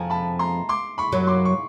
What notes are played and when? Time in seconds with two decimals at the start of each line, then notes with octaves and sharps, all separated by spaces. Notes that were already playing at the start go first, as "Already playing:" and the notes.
Already playing: F2 F3 G#5 A#5
0.10 A5 B5
0.39 A#5 C6
0.69 C6 D6
0.98 B5 C#6
1.12 F#2 F#3
1.27 C6 D6
1.45 C#6